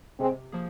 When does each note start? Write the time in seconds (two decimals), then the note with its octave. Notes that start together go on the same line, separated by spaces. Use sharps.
0.19 C3 G#3 C4
0.52 F3 A#3 G#4